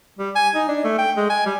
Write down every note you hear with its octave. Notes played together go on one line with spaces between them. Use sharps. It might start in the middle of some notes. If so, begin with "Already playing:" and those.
G3
G#5
D#4
D4
A3
G5
G#3
G#5
G3